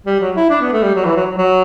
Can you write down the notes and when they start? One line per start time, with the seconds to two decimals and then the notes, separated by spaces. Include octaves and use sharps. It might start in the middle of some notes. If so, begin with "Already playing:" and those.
0.06 G3
0.20 F#3
0.36 E4
0.50 D4
0.61 B3
0.72 A3
0.83 G3
0.94 F#3
1.05 E3
1.16 F#3
1.26 F#3
1.37 F#3